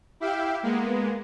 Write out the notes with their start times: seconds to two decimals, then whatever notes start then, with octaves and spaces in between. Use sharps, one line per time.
0.20 E4 G4 E5 F5 G5
0.63 G#3 A#3 B3